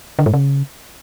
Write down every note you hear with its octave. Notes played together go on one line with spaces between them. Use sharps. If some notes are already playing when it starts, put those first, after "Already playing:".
D3
G#2
C#3